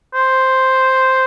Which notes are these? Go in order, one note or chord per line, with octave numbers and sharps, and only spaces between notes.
C5